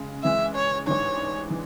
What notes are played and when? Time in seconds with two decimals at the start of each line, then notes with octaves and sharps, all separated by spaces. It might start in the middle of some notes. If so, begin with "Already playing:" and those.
Already playing: C#3 G#3
0.23 C#3 E3 G#3 E5
0.55 C#5
0.87 A1 G#2 E3 G#3 D4 C#5
1.50 E3